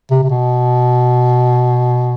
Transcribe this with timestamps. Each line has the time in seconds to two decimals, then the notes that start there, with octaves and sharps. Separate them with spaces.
0.11 C3
0.23 C3
0.30 B2